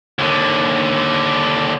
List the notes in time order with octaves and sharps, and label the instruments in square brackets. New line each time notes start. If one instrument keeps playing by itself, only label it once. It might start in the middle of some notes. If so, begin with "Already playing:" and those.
[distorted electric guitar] D#2 D3